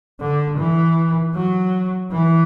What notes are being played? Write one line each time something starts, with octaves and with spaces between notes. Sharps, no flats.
D3
E3
F#3
E3